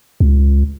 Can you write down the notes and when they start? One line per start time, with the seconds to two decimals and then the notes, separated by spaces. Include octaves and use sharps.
0.20 C#2